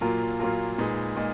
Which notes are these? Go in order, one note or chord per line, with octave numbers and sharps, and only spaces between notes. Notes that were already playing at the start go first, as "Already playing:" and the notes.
A#2 F#3 A#3 F4 A#4
A#2 F#3 A#3 F4 A#4
A#2 G#3 D#4 G#4 B4
A#2 G#3 D#4